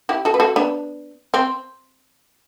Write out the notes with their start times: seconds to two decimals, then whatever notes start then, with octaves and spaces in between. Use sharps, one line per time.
0.09 E4 G4
0.25 F#4 A4
0.34 B4
0.40 F#4 A4
0.56 B3 D4
1.34 C4